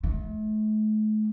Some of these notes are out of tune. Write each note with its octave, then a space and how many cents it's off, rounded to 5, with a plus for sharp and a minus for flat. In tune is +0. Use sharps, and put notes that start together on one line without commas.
A3 -40